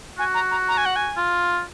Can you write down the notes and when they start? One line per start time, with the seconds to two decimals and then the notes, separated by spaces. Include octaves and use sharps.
0.18 F#4 G#5
0.34 A#5
0.51 A#5
0.68 A#5
0.77 G#5
0.86 F#5
0.96 G#5
1.17 F4